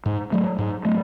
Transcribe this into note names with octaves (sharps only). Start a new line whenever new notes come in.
G#2
F#3 A3
G#2
F#3 A3